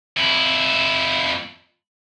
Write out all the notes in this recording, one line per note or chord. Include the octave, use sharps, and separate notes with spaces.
F2 E4